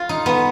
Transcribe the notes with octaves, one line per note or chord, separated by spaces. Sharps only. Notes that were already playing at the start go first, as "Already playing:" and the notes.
Already playing: F4
D#4
B3